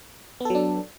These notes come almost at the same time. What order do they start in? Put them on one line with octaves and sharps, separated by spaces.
B3 A4 F#3 D4